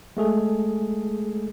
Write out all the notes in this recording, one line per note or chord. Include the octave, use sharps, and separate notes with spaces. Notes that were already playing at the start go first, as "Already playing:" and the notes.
G#3 A3 G#4 A4